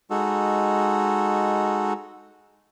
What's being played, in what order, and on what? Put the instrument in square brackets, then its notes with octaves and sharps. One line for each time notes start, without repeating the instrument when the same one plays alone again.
[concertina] G#3 D#4 F#4 A4